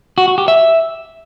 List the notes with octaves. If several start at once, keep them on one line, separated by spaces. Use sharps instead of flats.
F#4
F#4
G4
E5